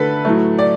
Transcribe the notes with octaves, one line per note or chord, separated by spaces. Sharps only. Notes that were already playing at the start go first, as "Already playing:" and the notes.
Already playing: D3 A3 A4 B4
A2 F#3 A3
D5